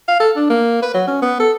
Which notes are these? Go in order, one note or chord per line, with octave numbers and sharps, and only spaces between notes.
F5
A4
D4
A#3
B4
F#3
C#4
B3
A4